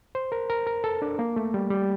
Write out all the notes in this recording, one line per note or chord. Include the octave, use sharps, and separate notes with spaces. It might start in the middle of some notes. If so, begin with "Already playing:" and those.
C5
A#4
A#4
A#4
A4
D4
A#3
A3
G3
G3